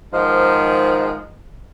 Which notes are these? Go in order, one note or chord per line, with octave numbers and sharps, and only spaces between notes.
G#2 D#3 F3 G#3